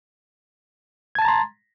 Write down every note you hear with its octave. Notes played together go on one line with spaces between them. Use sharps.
A5 A#5 C6 G#6 A6